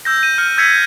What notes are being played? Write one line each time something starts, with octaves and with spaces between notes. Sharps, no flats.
E6 G6 A#6
D#7
F6 G6 C#7 D#7
E6 G6 G#6 B6 C#7 D#7